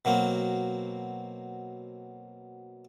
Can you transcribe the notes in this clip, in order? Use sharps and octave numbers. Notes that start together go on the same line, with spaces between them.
B2 F#3 A#3 C4